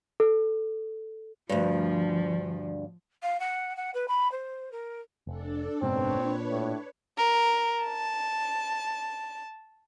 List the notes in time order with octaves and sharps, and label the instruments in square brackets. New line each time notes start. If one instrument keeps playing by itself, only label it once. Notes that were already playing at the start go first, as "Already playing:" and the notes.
[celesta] A4
[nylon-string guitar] D2 G2 [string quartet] F3
[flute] F5
F#5
F#5
B4
B5
C5
A#4
[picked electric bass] F1 [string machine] D4 A4
[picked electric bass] F#1 G#2 B2 [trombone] C4 [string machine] D4 B4 C#5
[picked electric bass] A#2
[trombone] A2
[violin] A#4
A5